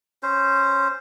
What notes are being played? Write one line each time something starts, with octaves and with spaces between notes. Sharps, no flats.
C#4 C5